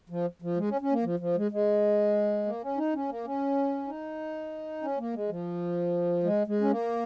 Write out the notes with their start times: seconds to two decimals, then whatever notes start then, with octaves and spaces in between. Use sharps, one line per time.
0.10 F3
0.42 F3
0.57 G#3
0.69 C#4
0.81 C#4
0.92 A#3
1.04 F3
1.20 F3
1.36 G#3
1.51 G#3
2.45 A#3
2.62 C#4
2.77 D#4
2.94 C#4
3.09 A#3
3.25 C#4
3.87 D#4
4.82 C#4
4.98 A#3
5.14 G#3
5.29 F3
6.24 G#3
6.47 G#3
6.61 C#4
6.70 A#3